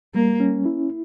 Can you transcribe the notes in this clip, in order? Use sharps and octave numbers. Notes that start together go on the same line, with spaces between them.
G3 A#3
C#4
E4